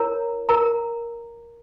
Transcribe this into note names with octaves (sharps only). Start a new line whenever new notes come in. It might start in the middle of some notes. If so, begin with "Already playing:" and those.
Already playing: E4 A#4 C#5 A#5
A#4 A#5